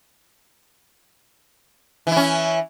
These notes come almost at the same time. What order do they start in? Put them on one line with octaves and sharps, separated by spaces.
E3 E4 C#4